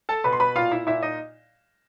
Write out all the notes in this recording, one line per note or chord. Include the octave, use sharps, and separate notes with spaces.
A4 A5
B2 B4 B5
C6
B4 B5
A#2 F4 F5
E4 E5
A#2 E4 E5
D#4 D#5